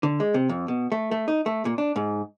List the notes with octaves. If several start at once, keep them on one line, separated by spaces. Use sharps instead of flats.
D3
G#3
C3
F2
B2
A3
A3
D#4
A3
A#2
D4
G#2